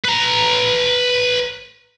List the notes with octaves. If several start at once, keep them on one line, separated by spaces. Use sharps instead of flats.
B4 A#5